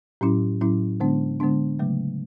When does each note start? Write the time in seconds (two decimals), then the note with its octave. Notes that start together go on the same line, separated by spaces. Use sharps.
0.21 A2 F#3 C#4 E4
0.61 A2 F#3 C#4 E4
1.00 D3 G#3 B3 D4
1.40 D3 G#3 B3 D4
1.79 C#3 F#3 A3